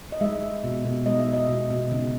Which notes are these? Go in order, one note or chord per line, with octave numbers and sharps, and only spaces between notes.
D#5
G#3 E5
G#3
B2
B2
G#3 D#5
E5
G#3
D#5
B2
B2
C#3